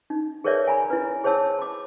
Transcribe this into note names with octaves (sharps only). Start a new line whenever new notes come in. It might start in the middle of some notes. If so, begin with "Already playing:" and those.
D#4
G#4 A#4 B4 C#5 D5 E5
G#5 A#5 B5
E4 B4
G#4 C5 C#5 A5 E6
B5 D6